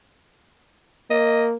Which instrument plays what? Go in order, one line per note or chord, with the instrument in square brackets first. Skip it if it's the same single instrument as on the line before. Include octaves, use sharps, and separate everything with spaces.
[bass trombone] A#3 [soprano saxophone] D#5